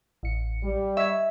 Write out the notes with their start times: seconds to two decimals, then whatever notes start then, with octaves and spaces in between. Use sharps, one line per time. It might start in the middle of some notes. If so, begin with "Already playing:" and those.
0.23 A1 C#7
0.63 G3
0.97 E5 C#6 G#6